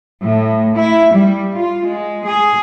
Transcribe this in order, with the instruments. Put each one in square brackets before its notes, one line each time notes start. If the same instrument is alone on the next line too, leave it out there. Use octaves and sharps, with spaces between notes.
[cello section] A2
E4
G3
F4
G#3
G#4